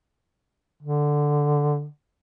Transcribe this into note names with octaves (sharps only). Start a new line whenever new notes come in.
D3